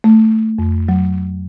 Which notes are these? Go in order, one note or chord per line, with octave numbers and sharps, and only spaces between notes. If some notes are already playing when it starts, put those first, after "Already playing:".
A3
F2
F#3